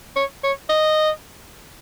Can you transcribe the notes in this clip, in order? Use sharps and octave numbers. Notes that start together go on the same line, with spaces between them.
C#5
C#5
D#5